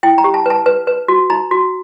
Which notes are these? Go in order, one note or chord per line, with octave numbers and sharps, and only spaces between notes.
E4 G5
A#5
G4
A5
B4 A5
B4
B4
F#4
D#4 A#5
F#4